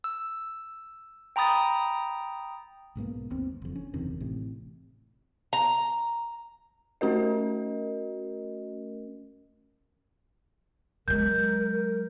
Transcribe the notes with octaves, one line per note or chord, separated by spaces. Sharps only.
E6
G5 A#5 B5 D#6 A6
B1 G#2 B2 A#3
G1 D#2 C4
F#1 F2
C#4
F#1 E2 C3 D#3
A1 A2 C3
A#5
A3 C#4 F#4 A#4 D#5
F#3 G#3 A#4 G6